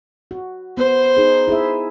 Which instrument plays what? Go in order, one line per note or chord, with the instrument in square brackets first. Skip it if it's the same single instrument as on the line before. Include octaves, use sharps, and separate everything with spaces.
[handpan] F#4
[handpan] B3 [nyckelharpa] C5
[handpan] D#4 G#4
E4 G#4 E5